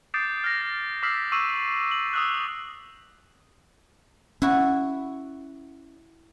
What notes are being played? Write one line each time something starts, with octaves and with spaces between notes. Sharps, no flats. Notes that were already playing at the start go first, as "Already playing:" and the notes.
D6 D#6 G6 A6 C7 D7
F6 A6 A#6
D6 E6 F6 B6 C7 F#7
C#6 D6 E6 C7 D#7 F#7
F#7
D#6 E6 F#6
C#4 E4 F#4